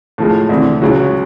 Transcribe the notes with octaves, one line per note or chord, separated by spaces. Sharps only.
A2 F3 G#3
D2 C3 E3
C#2 C#3 F#3